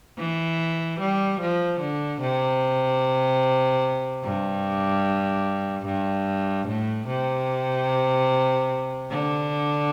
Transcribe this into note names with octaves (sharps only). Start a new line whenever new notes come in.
E3
G3
F3
D3
C3
G2
G2
A2
C3
D3